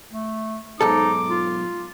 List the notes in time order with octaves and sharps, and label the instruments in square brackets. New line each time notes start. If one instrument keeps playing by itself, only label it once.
[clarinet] A3
[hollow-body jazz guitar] B1 G#2 A4 [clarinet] D#4 [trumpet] D6
[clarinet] F4